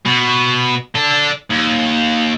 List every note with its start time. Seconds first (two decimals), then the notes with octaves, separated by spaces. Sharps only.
0.05 B2
0.95 D4 A4
1.50 D#2